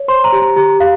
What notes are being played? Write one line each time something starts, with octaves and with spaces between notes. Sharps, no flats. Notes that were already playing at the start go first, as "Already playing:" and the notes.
Already playing: C#5
C5 C6
A#5
G4
A#5
G4 A#5
G4 F5